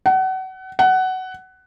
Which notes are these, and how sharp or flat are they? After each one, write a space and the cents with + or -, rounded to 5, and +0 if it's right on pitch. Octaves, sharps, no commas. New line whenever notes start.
F#5 +30
F#5 +15